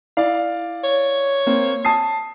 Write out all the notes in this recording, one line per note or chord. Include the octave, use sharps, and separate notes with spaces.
E4 D5 F5
C#5
A#3 C4
A5 D#6 C7